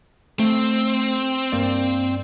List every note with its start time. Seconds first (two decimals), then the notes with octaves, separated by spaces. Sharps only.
0.39 A3 C4
1.52 G2 A#3 D5